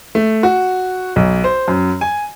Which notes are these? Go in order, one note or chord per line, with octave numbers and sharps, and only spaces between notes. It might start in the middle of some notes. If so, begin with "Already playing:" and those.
A3
F#4
B1
C5
F#2
G#5